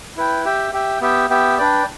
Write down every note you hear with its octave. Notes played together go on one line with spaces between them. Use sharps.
E4 B4 G5
G4 E5 G5
G4 E5 G5
B3 G4 E5 G5
B3 G4 E5 G5
D4 B4 D5 G5